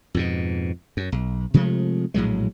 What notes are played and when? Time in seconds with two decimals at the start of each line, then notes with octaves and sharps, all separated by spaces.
0.14 F2 G#2 B2
0.97 F#2
1.12 B1
1.54 C3 F3 G#3 A3
2.14 A#1 A2 F#3 G#3